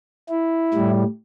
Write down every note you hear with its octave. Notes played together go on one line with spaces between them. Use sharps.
E4
A2 G3